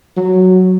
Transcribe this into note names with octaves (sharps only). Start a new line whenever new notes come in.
F#3